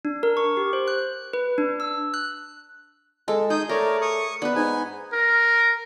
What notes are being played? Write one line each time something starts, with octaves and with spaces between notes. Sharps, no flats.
D4
A#4
C#6
G4
C5
F#6
B4
D4
E6
F#6
G#3 A4
D#4 G#4 D#6 G6
A3 A#4 C#5 D5
C#6 D#6
B3 D4 B4
G#2 D#4 G#5
A#4